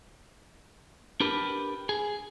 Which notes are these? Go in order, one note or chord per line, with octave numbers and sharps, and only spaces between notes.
D4 G4 A#4 B4
G#4